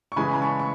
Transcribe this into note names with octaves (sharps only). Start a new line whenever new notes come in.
C#6
C#3 E3 G#3 G#5 B5
B5
A5 C#6
C#6